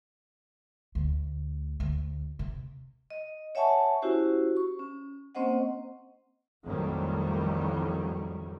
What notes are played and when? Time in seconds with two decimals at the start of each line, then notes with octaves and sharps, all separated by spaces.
0.95 D2
1.80 D2
2.39 C3
3.10 D#5
3.55 C#5 E5 F#5 G#5 A5 C#6
4.02 C#4 E4 F#4 G4 C5
4.57 C#6
4.79 C#4
5.35 A#3 C4 C#4 C5 D#5 F#5
6.64 A1 F2 D#3 F#3 G3